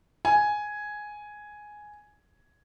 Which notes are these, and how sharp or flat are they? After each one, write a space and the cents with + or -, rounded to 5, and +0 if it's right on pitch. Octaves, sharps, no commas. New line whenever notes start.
G#5 +5